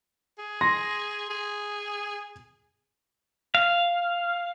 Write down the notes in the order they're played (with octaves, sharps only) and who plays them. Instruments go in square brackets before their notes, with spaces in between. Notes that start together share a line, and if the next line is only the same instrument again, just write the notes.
[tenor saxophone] G#4
[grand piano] C6 A#6
[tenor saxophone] G#4
[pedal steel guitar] F5